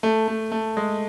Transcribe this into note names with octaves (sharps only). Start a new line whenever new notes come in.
A3
A3
A3
G#3